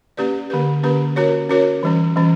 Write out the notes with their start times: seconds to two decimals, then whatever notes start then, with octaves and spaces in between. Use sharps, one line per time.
0.17 A#3 C#4 G4 B4 D5
0.50 D3 A#3 C#4 G4 B4
0.83 D3 A#3 C#4 G4 B4
1.16 C#4 F#4 A#4 C#5
1.49 C#4 F#4 A#4 C#5
1.83 E3 G3 C#4
2.16 E3 G3 C#4